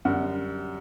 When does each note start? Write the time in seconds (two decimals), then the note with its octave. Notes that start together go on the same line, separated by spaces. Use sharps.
0.05 F#2 D3 G3 F#5